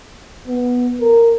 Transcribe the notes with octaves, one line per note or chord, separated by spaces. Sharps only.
B3
A#4